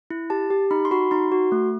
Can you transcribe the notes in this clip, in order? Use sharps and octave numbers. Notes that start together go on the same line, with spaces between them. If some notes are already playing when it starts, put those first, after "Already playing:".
E4
G4 A5
G4
D#4 B5
C6
F#4 B5
D#4 C6
F#4
A3